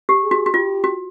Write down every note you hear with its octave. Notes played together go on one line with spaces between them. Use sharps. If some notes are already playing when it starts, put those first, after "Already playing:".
G4
G#4
F#4
F#4
F4 G4
F#4